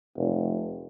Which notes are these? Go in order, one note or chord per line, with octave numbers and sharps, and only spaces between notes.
F1